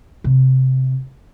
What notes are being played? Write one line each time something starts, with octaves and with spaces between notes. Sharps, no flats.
C3